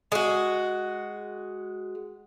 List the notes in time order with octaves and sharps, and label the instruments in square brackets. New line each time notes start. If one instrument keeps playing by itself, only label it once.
[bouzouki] G#3 F#4